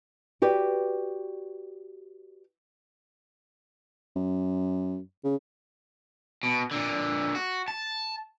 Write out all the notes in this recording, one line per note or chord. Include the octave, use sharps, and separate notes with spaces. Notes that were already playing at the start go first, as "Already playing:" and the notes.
F#4 G4 B4 D5
F#2
C#3
B2
A#2 D3
F#4
A5